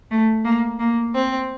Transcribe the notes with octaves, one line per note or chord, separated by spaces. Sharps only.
A3
A#3
A#3
C4